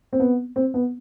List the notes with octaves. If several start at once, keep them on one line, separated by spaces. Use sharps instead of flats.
C4
B3
C4
B3